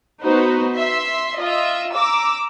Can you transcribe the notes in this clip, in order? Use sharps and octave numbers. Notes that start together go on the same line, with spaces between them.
B3 D#4 F#4 B4 C5
E5 C6
F4 D#5 E5
A#5 D6 E6